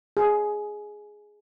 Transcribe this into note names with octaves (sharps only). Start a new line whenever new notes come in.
G#4